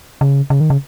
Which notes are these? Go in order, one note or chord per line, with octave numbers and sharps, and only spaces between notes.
C#3
C#3
D#3
C#3